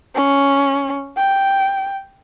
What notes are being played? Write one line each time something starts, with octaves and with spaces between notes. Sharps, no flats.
C#4
G5